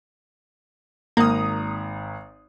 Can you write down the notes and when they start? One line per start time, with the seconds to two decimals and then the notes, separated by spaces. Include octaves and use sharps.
1.17 G#1 A#3 A#5 D#6